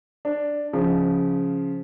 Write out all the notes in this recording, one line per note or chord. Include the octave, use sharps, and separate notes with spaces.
D4
C#3 F3